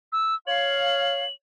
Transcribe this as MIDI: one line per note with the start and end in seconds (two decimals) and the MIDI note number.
0.12 0.35 88
0.47 1.24 73
0.47 1.24 77
0.47 1.32 102